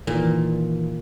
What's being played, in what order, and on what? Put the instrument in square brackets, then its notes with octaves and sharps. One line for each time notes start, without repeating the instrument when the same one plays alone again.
[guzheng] A#2 [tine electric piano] D#3 E3